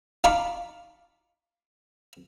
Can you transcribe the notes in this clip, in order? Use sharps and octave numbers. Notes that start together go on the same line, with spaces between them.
D#4 F5 A5 B5 C#6 D6